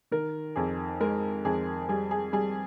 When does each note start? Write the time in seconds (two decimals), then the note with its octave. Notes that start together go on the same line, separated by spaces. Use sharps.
0.12 D#3 A#4
0.56 F2 G#4
1.00 G#3 A#4
1.45 F2 G#4
1.89 G3 G#4
2.11 G#4
2.33 G3 G#4